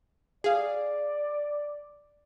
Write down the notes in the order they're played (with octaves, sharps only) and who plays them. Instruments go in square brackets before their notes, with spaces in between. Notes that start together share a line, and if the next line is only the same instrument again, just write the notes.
[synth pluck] G#4 F5 [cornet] D5